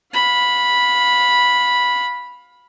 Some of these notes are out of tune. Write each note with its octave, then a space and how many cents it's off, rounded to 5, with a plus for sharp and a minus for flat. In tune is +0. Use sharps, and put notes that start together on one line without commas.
F5 +20 B5 -5